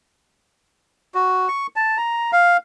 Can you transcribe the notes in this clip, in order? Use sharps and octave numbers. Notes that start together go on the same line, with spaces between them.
F#4
C#6
A5
A#5
F5